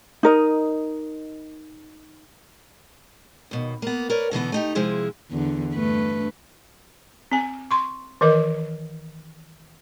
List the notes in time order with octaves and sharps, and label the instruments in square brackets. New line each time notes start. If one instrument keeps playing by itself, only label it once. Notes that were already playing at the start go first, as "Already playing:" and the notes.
[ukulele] D#4 A#4 D#5
[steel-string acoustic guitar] D#2 B2
A#3 B3
A#4 B4 C#5 D5
B2 D3 E3 B3
A3 D#4 G4
C3 F3 G#3 E4 G#4
[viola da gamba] E2 D3
G2 A3 B4
[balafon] C4 G#5
C6 C#6
D#3 E3 A#4 B4 D#5